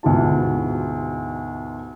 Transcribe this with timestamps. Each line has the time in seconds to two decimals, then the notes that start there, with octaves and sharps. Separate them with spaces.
0.03 D2 G#2 B2 E4 F4 A5